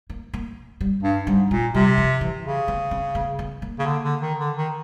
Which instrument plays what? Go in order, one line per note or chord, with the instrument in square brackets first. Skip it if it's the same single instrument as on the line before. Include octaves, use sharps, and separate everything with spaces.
[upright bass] A#3
A#3
G3
[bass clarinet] G2
[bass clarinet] G#2 [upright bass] G3
[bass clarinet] A#2 [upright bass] G#3
[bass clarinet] C3 [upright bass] G3
[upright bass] F3
E3
[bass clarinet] C#3
[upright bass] B3
C4
B3
B3
A#3
[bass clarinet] C#3
D3
D3
D#3
D3
D#3